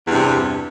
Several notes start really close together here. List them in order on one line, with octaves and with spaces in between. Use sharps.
E2 G2 C3